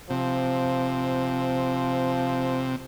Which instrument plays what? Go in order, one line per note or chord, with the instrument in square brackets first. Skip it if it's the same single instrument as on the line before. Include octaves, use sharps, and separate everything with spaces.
[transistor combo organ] C3 [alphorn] F3